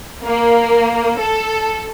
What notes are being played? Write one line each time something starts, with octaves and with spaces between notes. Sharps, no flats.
A#3
A4